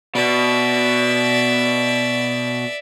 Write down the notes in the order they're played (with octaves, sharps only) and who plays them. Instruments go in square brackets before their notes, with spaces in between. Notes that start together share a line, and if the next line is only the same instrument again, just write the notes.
[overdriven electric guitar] B2 [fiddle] D5 E5